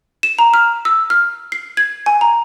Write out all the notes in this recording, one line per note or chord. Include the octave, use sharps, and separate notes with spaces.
E7
A#5
F6
E6
F6
C7
G#6
G#5
A#5